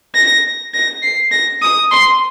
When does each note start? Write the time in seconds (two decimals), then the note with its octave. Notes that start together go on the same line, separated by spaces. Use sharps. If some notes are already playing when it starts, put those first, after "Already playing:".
0.15 A#6
0.74 A#6
1.03 C7
1.32 A#6
1.62 D#6
1.91 C6